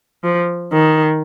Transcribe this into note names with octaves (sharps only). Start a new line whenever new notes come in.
F3
D#3